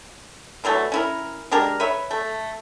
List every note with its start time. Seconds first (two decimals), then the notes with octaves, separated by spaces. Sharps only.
0.64 D3 E3 F#3 A3
0.92 C#4 E4 A#4
1.51 G#3 D4 G4 A#4
1.80 B4 C#5 E5
2.11 A3